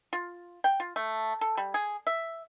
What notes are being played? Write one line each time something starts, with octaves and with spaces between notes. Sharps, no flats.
F4
G5
F4
A3
A4
G3
G#4
E5